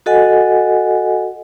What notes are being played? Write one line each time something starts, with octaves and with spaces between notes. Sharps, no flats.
F#4 A4 D#5 F#5 G#5